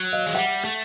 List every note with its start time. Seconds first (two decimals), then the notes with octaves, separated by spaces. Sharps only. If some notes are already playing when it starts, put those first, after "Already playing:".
Already playing: F#3
0.13 D#5 F5
0.26 G#3
0.35 G3 E5 F#5
0.65 A3